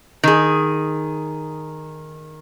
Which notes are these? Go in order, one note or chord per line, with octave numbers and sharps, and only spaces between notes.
D#3 G#4